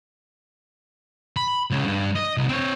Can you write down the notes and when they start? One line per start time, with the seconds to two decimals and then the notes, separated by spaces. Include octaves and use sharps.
1.36 B5
1.71 C#2 C#3
1.85 G2
2.15 D#5
2.37 C2
2.49 C4 C#5